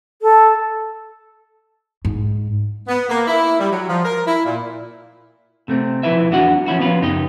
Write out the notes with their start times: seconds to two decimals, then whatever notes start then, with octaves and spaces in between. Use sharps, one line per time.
0.22 A4
2.05 G#2
2.88 B3
3.09 A#3
3.27 E4
3.59 G3
3.71 F#3
3.89 F3
4.04 A#4
4.26 E4
4.45 A#2
5.68 C3 A3 C4
6.03 B1 F3 E4 B4 E5
6.31 E2 F#3 B3 D4 F#4 F#5
6.66 F3 C#4 E4 F#4
6.79 F3 B3 C#4 F4 B4
7.01 C#2 F#2 D#4 G4 D#5